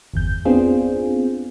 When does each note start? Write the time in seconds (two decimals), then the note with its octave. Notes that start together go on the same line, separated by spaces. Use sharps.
0.14 G1 E2 G6
0.45 B3 C4 D4 F4 G#4